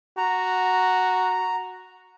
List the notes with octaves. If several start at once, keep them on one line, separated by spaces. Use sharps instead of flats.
F#4 A#5